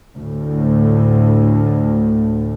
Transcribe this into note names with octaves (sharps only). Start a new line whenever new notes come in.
D2 A2